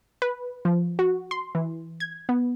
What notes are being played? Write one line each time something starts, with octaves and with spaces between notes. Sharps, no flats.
B4
F3
F#4
C6
E3
G#6
B3